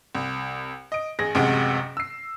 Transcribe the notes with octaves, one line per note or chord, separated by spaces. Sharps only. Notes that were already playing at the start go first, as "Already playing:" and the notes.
C2
D#5 D7
A1 G#4 A#6
A1 F#2 C3 G#3 F#5 D7
E6 C7